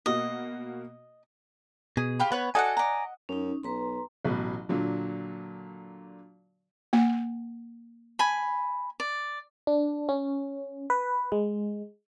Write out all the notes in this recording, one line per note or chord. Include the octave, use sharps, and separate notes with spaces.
B2 A#3 F#4 D#5
B2 G#4
F4 G4 B5
B3 B4 C#5
F#4 A4 D5 D#5 F5 F#5 G#5
D5 A#5
F#2 C#4 D#4
B1 B4 A#5 C6
A1 B2 F#3
A#2 D3 F#3
A#3 F#5
G#5 B5
D5
D4
C#4
B4
G#3